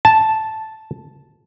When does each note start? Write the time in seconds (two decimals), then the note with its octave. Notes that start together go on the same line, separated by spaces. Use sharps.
0.05 A5